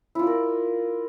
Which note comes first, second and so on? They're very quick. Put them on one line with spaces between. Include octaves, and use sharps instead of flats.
E4 F4 D5 A#4